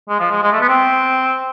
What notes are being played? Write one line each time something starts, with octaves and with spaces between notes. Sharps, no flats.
G#3
F3
G#3
G#3
A3
B3
C4